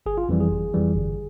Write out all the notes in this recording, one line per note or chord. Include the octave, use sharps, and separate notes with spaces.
G1 G#4
F4
F2 E3 G3
G#4
G1
F2 E3 G3
G1